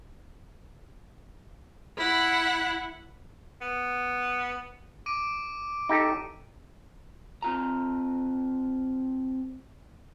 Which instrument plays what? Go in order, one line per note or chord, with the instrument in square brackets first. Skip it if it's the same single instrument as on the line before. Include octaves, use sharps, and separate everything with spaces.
[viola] E4 F#5
[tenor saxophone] B3
[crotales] D6 D7 D#7
[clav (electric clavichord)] D#4 G4 A4
[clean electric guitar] C4 F4 A#5